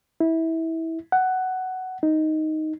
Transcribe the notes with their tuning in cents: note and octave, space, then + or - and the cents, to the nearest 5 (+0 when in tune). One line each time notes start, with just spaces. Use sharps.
E4 -20
F#5 +10
D#4 +5